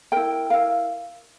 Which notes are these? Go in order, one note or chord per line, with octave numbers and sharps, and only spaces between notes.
E4 A#4 G5
E4 A#4 F5